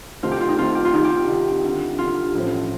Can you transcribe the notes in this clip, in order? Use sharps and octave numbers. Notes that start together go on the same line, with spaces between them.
C2 C3 D#3 A3 C4 F4
G4
F4
D#4
C2 C3 D#3 A3 C4 F4
G4
F4
C2 C3 D#3 G3 D#4
G4
C2 C3 D#3 G3
D2 C3 G3
D2 C3 G3 F4
A1 A2 F3 C4